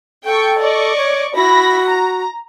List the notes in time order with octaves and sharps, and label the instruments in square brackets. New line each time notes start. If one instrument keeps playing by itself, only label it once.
[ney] A4 [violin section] G5 C#6
[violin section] D5 D#5 C#6
[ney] C#5
[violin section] E4 B5 A#6 [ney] F#4
[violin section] A#5